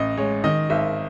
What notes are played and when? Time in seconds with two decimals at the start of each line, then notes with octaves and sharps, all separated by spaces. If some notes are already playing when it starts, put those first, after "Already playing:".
Already playing: A1 D#5
0.17 G#3 C#5
0.44 D#3 D#5
0.70 G#1 E5